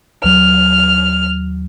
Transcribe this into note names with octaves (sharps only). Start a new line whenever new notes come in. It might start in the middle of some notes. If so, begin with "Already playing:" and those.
D#2 F#3 F6